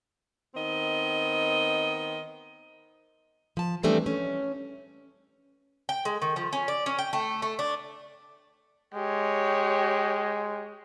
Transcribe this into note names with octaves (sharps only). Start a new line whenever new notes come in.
D#3 B3 C4 D#5
F3 A5
E3 G3 A3 C4 D4
C#4
G5
G#3
D#3
F3
C#4
D5
C#4
G5
A3
A3
D4
G#3 G4 C#5